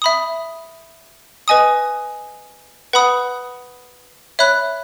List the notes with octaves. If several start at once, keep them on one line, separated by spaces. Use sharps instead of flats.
E5 B5 D#6
B4 D#5 G#5 D#6
B4 F#5 B5 D#6
C#5 E5 B5 F#6